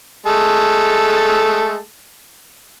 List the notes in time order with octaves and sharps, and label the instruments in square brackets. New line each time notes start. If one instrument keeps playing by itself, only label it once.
[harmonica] G#3 A3 A4